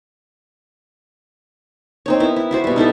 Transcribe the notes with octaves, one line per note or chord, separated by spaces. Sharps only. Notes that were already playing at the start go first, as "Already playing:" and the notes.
C4 D#4 C#5
B3 E4 A#4
E4
E4 F#4 C5
B2 G3
D#4 E4 A4 E5